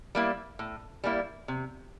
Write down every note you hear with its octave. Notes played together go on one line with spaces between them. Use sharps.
G3 A#3 E4
A2
G3 A#3 E4
C3